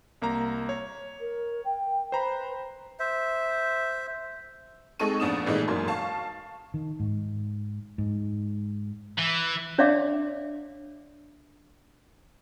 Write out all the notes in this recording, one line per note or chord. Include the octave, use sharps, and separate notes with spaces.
C2 A#3 A#5
C#5
A#4
G5
B4 C5 A#5 B5
C5 E5
G#3 C4 D#4 A4 C#6 D#7
A#1 F2 B3 D4 D#6 E7
A#2 D#3 E3 G#3 A3 D#4
G#1 F#2 A#3 C6
F5 A5 C#6
D#3
G#2
G#2
E3
D4 C#5 D5 E5 F5 D6